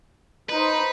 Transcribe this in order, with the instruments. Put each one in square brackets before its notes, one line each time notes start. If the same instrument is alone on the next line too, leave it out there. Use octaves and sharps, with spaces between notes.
[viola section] D#4 C5 [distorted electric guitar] B4